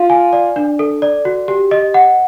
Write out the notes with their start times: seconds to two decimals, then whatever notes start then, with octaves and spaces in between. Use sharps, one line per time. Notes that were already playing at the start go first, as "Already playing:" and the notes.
Already playing: F4 F5
0.10 G#5
0.33 D5
0.56 D4
0.79 A4
1.02 D5
1.25 F#4
1.48 G4
1.71 D#5
1.94 F#5